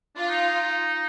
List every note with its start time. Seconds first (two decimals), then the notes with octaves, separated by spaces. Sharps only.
0.16 D4 F4
0.29 D#4
0.41 D#4